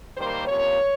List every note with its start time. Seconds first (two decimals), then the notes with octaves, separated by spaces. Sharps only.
0.17 D#3 G3 A#3 C5
0.47 C3 F3 A#3 C#4 C#5